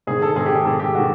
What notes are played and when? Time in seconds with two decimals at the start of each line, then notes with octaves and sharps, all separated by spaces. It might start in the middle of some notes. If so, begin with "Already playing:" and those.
0.07 G#2 D#3 G#4
0.22 A4
0.36 G#2 D#3 G#4
0.46 G4
0.55 G#4
0.65 G#2 D#3 A4
0.80 G4
0.95 D#3 F#4